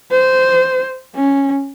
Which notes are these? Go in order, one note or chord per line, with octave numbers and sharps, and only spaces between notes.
C5
C#4